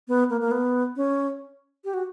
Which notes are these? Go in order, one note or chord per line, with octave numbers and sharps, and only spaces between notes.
B3
A#3
A#3
B3
C#4
G4
F#4